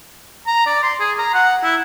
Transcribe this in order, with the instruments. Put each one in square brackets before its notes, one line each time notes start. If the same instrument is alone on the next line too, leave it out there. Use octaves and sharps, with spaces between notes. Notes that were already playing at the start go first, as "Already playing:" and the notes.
[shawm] A#5
D5
C6
G#4
A#5
F#5
E4